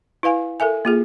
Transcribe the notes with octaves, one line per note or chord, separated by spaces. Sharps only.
E4 B4 F5 G#5
A4 A#4 E5 G#5
A#3 F4 G#4